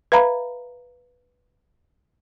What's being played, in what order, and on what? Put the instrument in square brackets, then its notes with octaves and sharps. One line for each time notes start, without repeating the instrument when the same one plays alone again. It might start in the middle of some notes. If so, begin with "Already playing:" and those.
[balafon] B4 E5 F5 A#5 B5